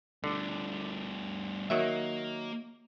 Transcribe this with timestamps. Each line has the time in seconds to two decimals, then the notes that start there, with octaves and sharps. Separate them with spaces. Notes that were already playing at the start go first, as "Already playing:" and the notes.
0.24 D2 D3 G3
1.70 D#3 F#3 A#3 E5